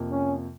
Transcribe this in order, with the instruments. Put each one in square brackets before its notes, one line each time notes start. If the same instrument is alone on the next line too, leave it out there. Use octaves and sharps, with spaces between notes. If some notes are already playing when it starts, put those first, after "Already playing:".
Already playing: [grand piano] F2 C3 F3 A#3
[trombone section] C#4